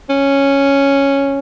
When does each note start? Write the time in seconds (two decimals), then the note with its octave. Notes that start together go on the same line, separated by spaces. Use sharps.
0.09 C#4